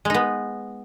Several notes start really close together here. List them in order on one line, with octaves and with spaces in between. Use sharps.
G#3 D#4 B3